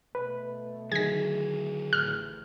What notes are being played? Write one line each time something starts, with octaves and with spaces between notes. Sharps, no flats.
B2 A3 B4
D3 D#3 F#3 G#4 G#6 A#6
A1 F6